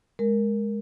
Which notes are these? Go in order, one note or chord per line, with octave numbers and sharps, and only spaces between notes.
G#3 A#4